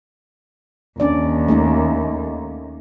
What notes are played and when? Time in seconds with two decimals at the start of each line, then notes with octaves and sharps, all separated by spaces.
1.00 D#2 C#4 D4 D5
1.48 A3 C#4 D#4